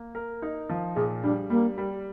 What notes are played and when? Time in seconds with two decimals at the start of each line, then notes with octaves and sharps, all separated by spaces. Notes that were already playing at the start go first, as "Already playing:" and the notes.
Already playing: A#3
0.15 A#4
0.42 D#4
0.70 F3
0.96 A#2 G#4
1.23 G3 D4
1.50 G3 A#3
1.78 G3